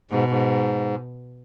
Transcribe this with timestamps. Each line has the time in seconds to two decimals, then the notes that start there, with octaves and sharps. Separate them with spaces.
0.11 G#2 B2
0.30 G#2